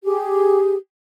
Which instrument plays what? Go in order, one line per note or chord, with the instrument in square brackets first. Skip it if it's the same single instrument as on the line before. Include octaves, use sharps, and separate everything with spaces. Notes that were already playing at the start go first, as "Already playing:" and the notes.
[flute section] G4 G#4